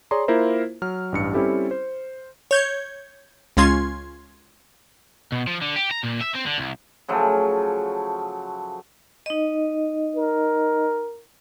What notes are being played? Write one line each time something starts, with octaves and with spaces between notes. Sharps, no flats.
G#4 C#5 D5 A#5 C6
A#3 E4 F4 A#4 C5
F#3 F6
A1 G2 C#7
G3 C4 C#4 E4 G4 A4
C5
C#5 G6 G#6
C#2 G#3 C#4 F4 C6 G#6
B2
F3
D3
G4
A#5
A#2
E5
C4
D3
C2
C#3 F3 F#3 A3
D#4 D#5
A#4